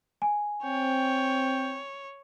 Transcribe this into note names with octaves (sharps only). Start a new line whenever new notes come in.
G#5
C4 C#5 G5